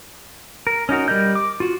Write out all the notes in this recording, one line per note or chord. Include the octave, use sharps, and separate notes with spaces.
A#4
C#4 D#4 F#4 A#4
G3 A#4 D5 D#5 G6
D6
F4 F#4